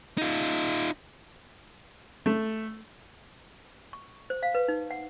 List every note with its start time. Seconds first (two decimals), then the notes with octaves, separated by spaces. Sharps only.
0.18 D#4 F4
2.26 A3
3.93 C#6
4.30 C5
4.43 F5
4.55 B4
4.68 D#4
4.91 F#5